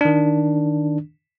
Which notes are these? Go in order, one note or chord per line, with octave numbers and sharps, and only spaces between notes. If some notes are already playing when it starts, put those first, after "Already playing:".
D#3 D4